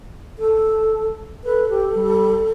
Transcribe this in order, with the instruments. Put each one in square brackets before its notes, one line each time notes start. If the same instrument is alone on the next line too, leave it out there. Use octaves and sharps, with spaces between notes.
[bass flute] A4
[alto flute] A4 [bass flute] B4
[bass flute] G4
G3